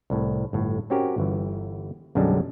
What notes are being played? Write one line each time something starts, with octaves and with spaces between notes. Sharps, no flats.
C2 A2
G1 A2
C4 C#4 F#4 G4 A#4
G1 E3
B1 F#2 D3 G3 G#3 A5